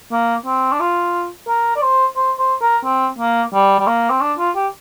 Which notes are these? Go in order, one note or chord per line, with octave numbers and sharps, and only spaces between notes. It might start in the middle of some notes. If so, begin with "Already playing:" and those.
A#3
C4
D4
F4
A#4
D5
C5
C5
C5
A#4
C4
A#3
G3
G3
A#3
C4
D4
F4
G4